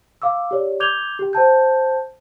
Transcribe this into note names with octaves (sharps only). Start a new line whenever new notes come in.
F5 D6 E6
G4 C#5 D5
D6 G6 G#6 F7 G7
G4 G5
C5 G5 A5 G6